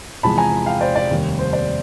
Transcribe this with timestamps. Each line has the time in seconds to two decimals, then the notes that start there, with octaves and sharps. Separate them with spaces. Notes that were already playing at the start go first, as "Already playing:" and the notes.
0.23 E2 C3 F3 G#3 A5 B5
0.38 G#5 A#5
0.66 F5 G5
0.81 C5 D5
0.95 C5 D5
1.10 F1 D#2 D#3 G3
1.39 C5
1.53 C5 D5